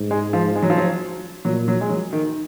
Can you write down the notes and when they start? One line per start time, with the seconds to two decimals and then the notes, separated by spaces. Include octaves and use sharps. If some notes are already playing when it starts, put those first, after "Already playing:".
Already playing: G#2
0.11 G#3
0.33 F3
0.56 G#3
0.63 F#3
0.70 F3
0.77 F#3
1.45 A#2 F#3
1.68 F#3
1.81 G#3
1.89 F#3
2.13 D#3